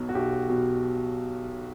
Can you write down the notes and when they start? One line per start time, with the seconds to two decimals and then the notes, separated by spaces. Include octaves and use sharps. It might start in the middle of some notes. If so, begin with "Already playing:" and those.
Already playing: B1 B2 F#3
0.09 F#4
0.15 B1 G4
0.49 B2 F#3